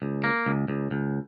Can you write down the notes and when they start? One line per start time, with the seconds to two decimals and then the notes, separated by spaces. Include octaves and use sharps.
0.02 C#2
0.24 A#3
0.46 C#2
0.68 C#2
0.91 C#2